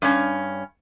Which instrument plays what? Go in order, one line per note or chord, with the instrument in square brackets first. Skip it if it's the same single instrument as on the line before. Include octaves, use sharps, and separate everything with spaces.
[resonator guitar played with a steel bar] G2 C#4